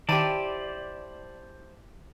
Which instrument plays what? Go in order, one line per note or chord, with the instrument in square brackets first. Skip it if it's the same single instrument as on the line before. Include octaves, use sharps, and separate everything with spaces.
[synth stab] D#3 D#7 [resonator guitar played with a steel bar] E4 G4 [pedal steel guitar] C5 A5 [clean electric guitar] D5